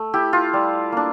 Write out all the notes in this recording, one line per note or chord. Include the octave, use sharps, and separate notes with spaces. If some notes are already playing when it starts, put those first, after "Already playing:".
Already playing: A3
E4 G4
F4
G3
A#3 D4